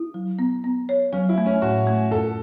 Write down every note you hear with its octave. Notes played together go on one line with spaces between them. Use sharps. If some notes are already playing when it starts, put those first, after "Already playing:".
Already playing: E4
F#3
B3
B3
C#5
F#3 C#4
E4
A3
C#4
A2 F#4
A3
F#2 A4